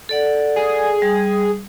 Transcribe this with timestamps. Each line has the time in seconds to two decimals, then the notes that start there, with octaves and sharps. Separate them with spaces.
0.09 A4 D5 F#5
0.56 G#4
1.02 G3